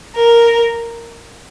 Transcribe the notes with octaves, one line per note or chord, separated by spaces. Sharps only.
A#4